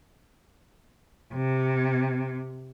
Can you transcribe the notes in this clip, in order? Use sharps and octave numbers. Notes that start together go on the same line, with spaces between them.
C3